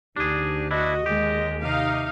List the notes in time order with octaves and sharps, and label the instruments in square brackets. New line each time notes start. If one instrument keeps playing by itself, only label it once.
[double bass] D2 D3 [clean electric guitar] D4 G#4 [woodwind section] D#4 G4
[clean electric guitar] D4 E4 [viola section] F#4 [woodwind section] D#5
[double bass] D#2 [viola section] G#3 [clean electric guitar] G4
[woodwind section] C3 [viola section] D#4 F5